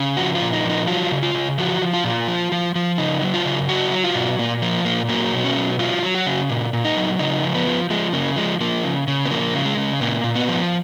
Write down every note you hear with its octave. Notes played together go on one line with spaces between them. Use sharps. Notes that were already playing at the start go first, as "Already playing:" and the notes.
Already playing: C#3
F3 F#4
F4
A#2
D#4
F3
D#4
F#3 F4
C#3
F4
C#3
F3 F#4
F3
F4
A#2
F3
F3
F3
C#3 D#4
F#3
F4
C#3
F#3 F#4
F#3
F4
B2
A#2 A#3
F3 A#3
A#2 A#3
F#3 A#3
B2
C#4
F#3
F#3 F4
F#3
F#4
C#3
A#2
A#2
D#4
F#3
C#3 D#4
F3
B3
F3
F3 G#3
C#3 A#3
F3 G#3
F3 A#3
C#3
C#3
B3
F3 A#3
C#3
G#3
C#3
A#2 A#3
A#2
B3
F3